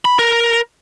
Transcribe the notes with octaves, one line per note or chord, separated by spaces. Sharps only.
B5
A#4